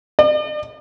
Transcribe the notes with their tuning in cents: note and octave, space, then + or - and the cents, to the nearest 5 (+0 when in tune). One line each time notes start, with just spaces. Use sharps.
D5 +45